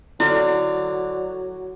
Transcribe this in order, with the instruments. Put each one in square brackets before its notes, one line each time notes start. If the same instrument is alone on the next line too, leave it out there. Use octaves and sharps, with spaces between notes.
[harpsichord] D3 F5 [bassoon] F#3 [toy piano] E4